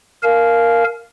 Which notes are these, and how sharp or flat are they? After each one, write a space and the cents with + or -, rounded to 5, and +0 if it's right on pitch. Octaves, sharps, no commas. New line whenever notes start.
A#4 +0 F5 -10 G#5 +45